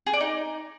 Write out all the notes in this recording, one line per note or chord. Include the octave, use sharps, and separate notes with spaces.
G#4
D5
D#4